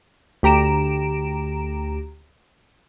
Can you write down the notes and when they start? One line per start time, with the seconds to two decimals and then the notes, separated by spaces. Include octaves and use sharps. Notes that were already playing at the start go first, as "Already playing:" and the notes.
0.43 D2 G4 A#5 D7 E7